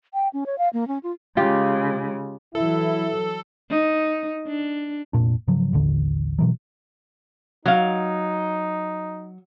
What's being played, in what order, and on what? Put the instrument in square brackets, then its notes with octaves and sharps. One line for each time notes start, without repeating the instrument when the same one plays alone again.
[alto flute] G5
C#4
C#5
F5
A#3
C#4
F4
[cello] C#3 G#3 [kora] F4 G4
[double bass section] E3 F#3 [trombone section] E4 [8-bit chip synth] A4
[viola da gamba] D#4
D4
[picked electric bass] F1 C2 A#2 D4
G#2 C#3 F3 F#3
A1 D#2 D3
B2 E3 F#3
[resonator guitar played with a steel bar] F#3 F5 [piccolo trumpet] D#4